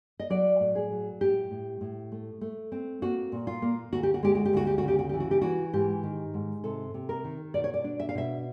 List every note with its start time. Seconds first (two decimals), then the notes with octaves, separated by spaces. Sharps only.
0.20 D#5
0.30 F#3 D5
0.60 A2
0.75 G#4
0.91 F#3
1.21 A2 G4
1.51 A2
1.81 A2
2.12 A3
2.41 A3
2.72 C4
3.02 A#3 F#4
3.32 A#2
3.47 F4
3.62 A#3
3.92 D2 F#4
4.03 G4
4.14 F#4
4.23 G#3 G4
4.35 F#4
4.45 G4
4.53 D2 F#4
4.67 G4
4.78 F#4
4.83 C#3
4.88 G4
4.99 F#4
5.09 E3 G4
5.20 F#4
5.31 G4
5.42 E3 F#4
5.73 G#2 G4
6.03 D#3
6.34 G#2
6.64 C3 A4
6.94 C3
7.09 A#4
7.24 D#3
7.54 B2 D5
7.64 C#5
7.74 D5
7.84 D4
8.00 E5
8.09 F5
8.15 B2 E5